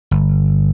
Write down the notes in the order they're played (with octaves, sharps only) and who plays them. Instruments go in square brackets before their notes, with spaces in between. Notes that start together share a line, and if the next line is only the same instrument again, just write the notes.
[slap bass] G1